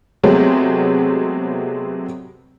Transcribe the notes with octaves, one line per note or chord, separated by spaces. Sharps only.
C3 F#3 G#3 A3 B3 C4